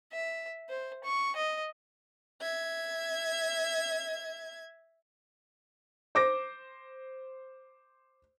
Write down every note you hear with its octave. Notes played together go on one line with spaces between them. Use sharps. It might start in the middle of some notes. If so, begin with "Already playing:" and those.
E5
C5
C#6
D#5
E5 G#6
C5 D6 A#6